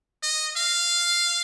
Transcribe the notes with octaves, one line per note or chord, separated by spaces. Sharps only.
D#5
F5